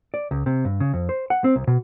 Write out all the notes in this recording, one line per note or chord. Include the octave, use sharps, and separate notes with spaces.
D5
C#2
C3
G2
C#3
F2
C5
F#5
C4
C2
B2